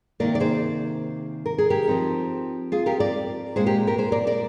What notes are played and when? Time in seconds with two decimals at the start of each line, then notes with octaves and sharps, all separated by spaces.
0.20 C3 D#3 A#3 A#4 D5
0.35 D5
0.40 G#4 C5
1.46 A#4
1.58 G#4
1.70 G4 A#4
1.88 F3 C4 D#4
2.72 F4 G#4
2.86 G4 A#4
3.00 A#4 D5
3.56 A#2 G#3 C4 G#4 C5
3.66 G4 A#4
3.87 G4 A#4
3.98 G#4 C5
4.12 A#4 D5
4.27 A#4 D5